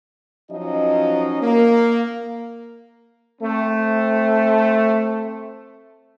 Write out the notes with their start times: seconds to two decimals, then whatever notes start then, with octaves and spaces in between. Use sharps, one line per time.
0.50 F3 F#3 C#4 D#4 D#5
1.42 A#3
3.42 A3 C4